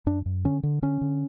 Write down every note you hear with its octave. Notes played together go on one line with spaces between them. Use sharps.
F#2 D4
F#2
D3 C#4
D3
D3 C#4
D3